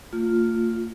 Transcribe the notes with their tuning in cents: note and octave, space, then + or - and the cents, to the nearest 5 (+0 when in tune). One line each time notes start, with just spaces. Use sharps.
A#3 -45 F4 +0